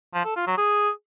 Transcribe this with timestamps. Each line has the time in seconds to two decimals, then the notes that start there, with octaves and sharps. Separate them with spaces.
0.14 F3
0.25 A4
0.36 F4
0.47 F#3
0.58 G#4